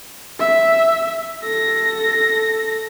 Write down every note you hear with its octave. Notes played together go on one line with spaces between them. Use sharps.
E5
A4 A#6